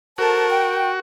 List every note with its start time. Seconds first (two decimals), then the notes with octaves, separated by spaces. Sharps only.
0.18 F#4 A4 A#4 C5 A5
0.50 G5